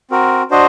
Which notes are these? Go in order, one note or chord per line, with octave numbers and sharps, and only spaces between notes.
C4 F#4 A#4
D4 F#4 C5 D#5